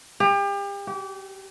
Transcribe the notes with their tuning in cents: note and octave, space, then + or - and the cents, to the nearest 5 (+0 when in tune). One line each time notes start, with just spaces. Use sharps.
G4 +35
G4 -30